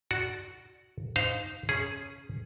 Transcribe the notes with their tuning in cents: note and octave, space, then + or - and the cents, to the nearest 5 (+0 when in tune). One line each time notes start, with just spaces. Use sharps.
F#4 +0 D5 +0
D#4 +0 C5 -20 F5 +0
C#4 +0 G#4 +0